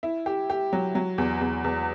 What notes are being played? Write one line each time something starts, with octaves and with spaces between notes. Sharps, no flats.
E4
G4
G4
F#3
F#3
E2
E2
E2